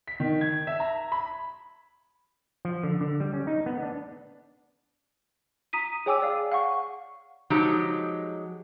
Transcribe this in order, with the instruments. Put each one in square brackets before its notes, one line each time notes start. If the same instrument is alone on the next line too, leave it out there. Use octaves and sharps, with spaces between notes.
[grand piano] B6
D#3
G#6
E5
A#5
B5
[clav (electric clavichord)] F3
D3
D3
G3
C#4
D#4
B3
D4
[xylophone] A#5 D#6 B6 D#7
G#4 C#5 G5 G#5 D6 E6
D5 F5
F5 F#5 C#6
[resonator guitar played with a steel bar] F3 F#3 G#3 D#4 G4